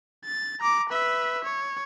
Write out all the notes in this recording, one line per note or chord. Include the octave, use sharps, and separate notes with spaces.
A6
A#5 D6
B4 E5
C#5